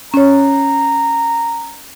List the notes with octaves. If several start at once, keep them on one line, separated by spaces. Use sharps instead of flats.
C#4 C#5 A#5